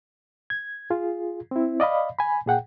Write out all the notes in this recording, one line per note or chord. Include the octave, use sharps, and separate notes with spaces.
G#6
F4 G#4
C4 E4
D5 D#5 F5 B5
G#5 B5
A#2 G#4 F#5 G5